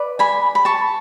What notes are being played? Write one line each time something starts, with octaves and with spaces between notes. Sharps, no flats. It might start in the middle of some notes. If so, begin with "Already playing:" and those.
Already playing: B4 D5
G#5 B5
B5
A5 C#6